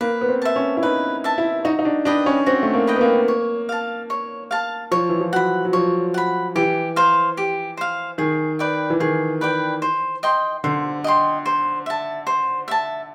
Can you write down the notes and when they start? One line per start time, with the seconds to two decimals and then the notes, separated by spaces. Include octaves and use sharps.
0.01 A#3 B4
0.21 B3
0.29 C4
0.42 E5 A5
0.56 C#4
0.77 E4
0.82 D#4 B4
1.24 E5 A5
1.38 E4
1.65 D#4 F#4
1.79 D#4
1.85 D4
2.05 D4 B4 D#5 G5
2.26 C#4
2.46 C4 F#4
2.63 A3
2.74 A#3
2.87 B4 D#5 G5
2.96 B3
3.01 A#3
3.28 C#5
3.69 F5 A5
4.10 C#5
4.51 F5 A5
4.91 F3 C#5
5.09 E3
5.21 F3
5.33 F#3 F#5 B5
5.65 F#3
5.73 F3 C#5
6.14 F#5 B5
6.56 E3 G4
6.96 C5 F5
7.37 G4
7.77 C5 F5
8.18 D#3 G#4
8.59 B4 D5 G5
8.90 E3
9.00 D#3 G#4
9.41 B4 D5 G5
9.82 C5
10.23 D#5 G5 C6
10.64 D3 C5
11.04 D#5 G5 C6
11.46 C5
11.86 E5 A5
12.27 C5
12.68 E5 A5